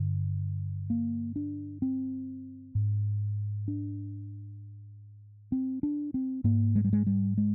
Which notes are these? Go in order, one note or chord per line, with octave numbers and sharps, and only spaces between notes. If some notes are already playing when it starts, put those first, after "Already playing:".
Already playing: G2 D3
A#3
D4
C4
G#2
D4
C4
D4
C4
G#2 A#3
G#3
G3
G#3
G3
G#3